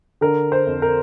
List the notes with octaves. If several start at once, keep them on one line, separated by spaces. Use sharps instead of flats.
D3 A#4
C5
F2
A#4